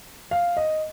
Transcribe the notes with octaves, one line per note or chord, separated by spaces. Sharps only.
F5
D#5